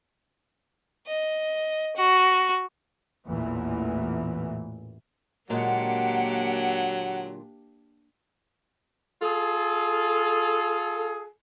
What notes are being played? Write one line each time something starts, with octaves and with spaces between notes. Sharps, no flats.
D#5
F#4
A1 E2 A#2 E3
A#2 D3 F#3 G#3 A#3 D4 G4 F#5
F4 G#4 A4